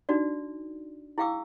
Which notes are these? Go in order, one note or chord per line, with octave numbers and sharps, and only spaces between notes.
D4 D#4 F#4 D5
E4 G#4 F5 G5 D6 E6